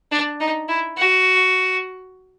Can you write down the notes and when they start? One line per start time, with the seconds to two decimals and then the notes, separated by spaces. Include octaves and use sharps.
0.12 D4
0.40 D#4
0.68 E4
0.98 F#4